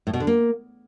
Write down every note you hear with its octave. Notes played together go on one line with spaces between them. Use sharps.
A2
B2
D3
A#3